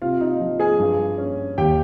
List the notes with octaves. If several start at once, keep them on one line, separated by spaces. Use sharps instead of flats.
C3 F4 F5
D#4 D#5
F3
G#4 G#5
G2
C#4
D#2 G4 G5